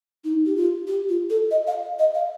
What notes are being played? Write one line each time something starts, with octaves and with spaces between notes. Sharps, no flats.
D#4
G4
F4
G4
F4
A4
D#5
F5
D#5
F5